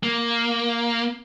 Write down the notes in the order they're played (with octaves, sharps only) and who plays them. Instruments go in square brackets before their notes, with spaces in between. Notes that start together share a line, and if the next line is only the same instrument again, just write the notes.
[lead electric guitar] A#3